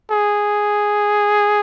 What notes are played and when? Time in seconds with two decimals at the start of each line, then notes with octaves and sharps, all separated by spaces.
0.11 G#4